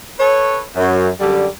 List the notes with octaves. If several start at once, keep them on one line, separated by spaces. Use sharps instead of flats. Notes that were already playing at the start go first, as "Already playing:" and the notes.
A4 B4 C#5
F#2
F#2 D3 G3